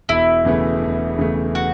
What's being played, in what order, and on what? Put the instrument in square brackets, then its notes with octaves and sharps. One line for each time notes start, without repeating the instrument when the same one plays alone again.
[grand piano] E1 [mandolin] E4
[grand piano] E2 C#3 E3 A3
E1
E2 C#3 E3 A3
[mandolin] F#4